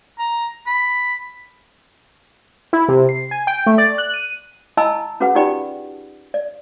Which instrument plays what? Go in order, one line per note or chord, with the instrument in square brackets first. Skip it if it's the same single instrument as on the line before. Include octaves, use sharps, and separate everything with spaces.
[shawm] A#5
B5
[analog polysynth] E4
C3
C7
G#5
G5
A3
D5
F#6
D#7
[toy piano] E4 D#5 G#5 A5 B5 E6
C#4 F#4 G#4 B4 F#5
D#4 F4 G4 D5 G5 B5
D5